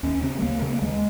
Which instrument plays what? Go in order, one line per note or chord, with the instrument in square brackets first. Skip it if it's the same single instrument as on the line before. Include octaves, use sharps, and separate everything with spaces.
[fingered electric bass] D#2 C#4
C#3 C4
G#3
D#2 A#3
C#3 A#3
A#3
D#2 G#3